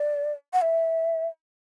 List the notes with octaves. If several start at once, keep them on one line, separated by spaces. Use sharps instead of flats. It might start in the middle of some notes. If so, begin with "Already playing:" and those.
Already playing: D5
F#5
E5